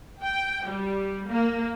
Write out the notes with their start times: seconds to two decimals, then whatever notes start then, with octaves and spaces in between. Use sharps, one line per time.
0.22 G5
0.67 G3
1.28 A#3